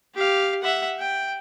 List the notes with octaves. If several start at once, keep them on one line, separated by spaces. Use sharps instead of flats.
G4 F5
E5 F#5
G5